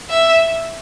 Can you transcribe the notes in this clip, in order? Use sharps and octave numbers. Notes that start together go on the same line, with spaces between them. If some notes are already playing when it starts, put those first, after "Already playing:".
E5